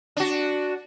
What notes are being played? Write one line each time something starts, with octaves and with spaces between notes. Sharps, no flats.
D4 F#4